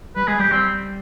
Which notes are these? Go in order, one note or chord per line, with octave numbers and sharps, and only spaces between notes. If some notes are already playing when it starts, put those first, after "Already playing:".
G3 B4
G#3 G#4
G3 G4
G3 C4